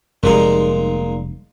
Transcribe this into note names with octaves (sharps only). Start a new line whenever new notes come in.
F1 A#2 G3 G#3 D#4